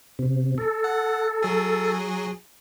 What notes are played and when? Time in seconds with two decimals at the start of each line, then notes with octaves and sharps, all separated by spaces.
0.19 C3
0.58 A4
0.84 F#5
1.43 F#3 G#4